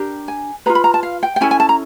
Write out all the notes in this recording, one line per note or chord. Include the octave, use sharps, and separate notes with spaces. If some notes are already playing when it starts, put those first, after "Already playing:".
Already playing: D4 G4 A#4
G#5
F4 G#4 B4 A#5
B5
A#5
A5
F5
G5
G5
C#4 E4 A4 G#5
G#5
A5
A#5